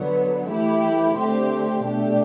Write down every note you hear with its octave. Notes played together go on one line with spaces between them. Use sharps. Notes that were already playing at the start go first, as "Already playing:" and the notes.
Already playing: D3 F#3 B3
E3 A3 E4 G4
D3 A3 C4 G4
B2 A3 D4 G4